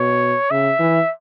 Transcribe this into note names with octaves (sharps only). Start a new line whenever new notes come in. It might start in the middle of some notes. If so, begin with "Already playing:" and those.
Already playing: B2 C#5
C#3 E5
E3